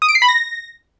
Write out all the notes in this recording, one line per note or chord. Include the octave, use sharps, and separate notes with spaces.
D#6
D7
C7
B5
A#6